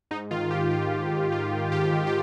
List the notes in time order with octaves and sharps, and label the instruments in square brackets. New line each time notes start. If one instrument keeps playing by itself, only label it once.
[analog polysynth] G#2 D#4
D#3 F4
D#3 G4
D#3 F4
G#2
D#3
D#3 F4
D#3
G#2 G4
D#3
G4